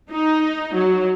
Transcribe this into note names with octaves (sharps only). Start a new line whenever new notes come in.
D#4
F#3